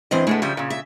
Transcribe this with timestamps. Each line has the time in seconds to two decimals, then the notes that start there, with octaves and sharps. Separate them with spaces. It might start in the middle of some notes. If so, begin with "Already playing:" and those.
0.11 E2 G2 E3 C4 D#5
0.27 A2 G#3 A3 B3
0.42 C#3 F3 G3 E5
0.57 A#2 C#3
0.70 E5